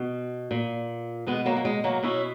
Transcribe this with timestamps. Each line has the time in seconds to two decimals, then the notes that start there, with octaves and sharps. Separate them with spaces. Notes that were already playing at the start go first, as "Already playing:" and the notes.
Already playing: B2
0.51 A#2
1.27 B2 G#3 B3
1.46 F#3 A#3
1.56 A#3
1.65 G#3
1.84 F#3 A#3
2.03 B2 C#4 E4